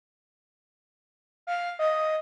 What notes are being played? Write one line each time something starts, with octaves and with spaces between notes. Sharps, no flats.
F5
D#5